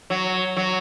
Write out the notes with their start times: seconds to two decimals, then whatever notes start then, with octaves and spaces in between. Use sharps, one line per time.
0.10 F#3
0.57 F#3